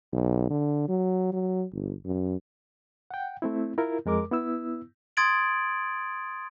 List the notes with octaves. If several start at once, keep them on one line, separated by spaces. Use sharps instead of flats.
B1
D3
F#3
F#3
G1
F#2
F#5 G5
A3 C4 E4
E4 F4 A#4
F2 G#3 A#4 D6
B3 E4 E6
C6 D#6 G#6 A6 D7 F#7